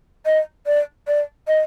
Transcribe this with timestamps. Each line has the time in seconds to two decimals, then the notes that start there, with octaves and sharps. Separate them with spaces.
0.26 D#5
0.66 D5
1.07 D5
1.48 D#5